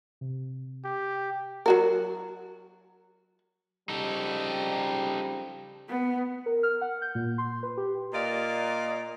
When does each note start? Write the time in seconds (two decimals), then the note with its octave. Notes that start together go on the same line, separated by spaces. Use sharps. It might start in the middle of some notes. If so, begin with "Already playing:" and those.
0.21 C3
0.85 G4
1.66 F#3 F#4 A#4
3.89 C#3 F3 G3 D#4 A4
5.89 B3
6.46 A#4
6.63 F6
6.81 F#5
7.02 G6
7.15 A#2
7.38 C6
7.63 B4
7.77 G4
8.14 A#2 D5 D#5 F5